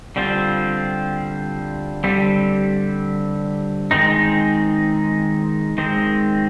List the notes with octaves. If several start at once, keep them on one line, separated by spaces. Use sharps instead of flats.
D3 G3 C4 F4
D3 G3 C4
D#3 G#3 C4 D#4
D#3 G#3 C4